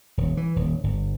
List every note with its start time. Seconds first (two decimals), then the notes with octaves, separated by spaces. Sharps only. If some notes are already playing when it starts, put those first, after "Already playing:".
0.18 D#1
0.37 E3
0.56 D#1
0.84 G1